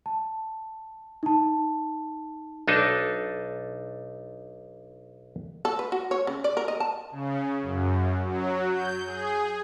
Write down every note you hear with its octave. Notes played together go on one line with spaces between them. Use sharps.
A5
D#4 A5
B1 D4 D#4 A4
A4
B4
F#4
C#5
C#3
D5
A#4
D#5
A5
C#3
F#2
F#3
G6
G#4